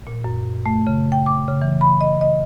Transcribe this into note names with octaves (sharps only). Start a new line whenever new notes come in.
A#2
F#2
A3
C#3
G5
D6
C#3
E3
B5
D#5
D#5